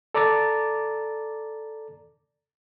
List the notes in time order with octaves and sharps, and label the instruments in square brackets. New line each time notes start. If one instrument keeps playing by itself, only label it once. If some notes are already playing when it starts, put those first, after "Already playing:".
[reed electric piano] A4 D5 A#5 D6 A6